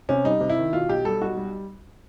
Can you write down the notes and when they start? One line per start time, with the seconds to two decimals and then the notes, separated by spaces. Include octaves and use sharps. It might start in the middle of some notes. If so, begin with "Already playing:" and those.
0.09 C3 C#4
0.24 G3 D#4
0.41 C3
0.50 E4
0.58 D#3
0.73 B2 F4
0.89 B1 G4
1.05 G3 A4
1.21 B1 F#4
1.37 G3